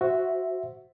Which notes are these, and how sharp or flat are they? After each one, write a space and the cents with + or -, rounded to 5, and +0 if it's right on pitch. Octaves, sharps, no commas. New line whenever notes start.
F#4 +5 C5 +0 E5 +0